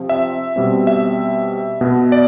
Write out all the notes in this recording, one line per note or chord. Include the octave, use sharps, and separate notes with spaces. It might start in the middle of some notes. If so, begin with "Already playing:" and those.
Already playing: C3 F3 C4
E5
B2 G3 C4
E5
B2 B3
D5